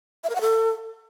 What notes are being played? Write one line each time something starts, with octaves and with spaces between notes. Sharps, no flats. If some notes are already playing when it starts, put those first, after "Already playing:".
E5
A#4
F#5
A4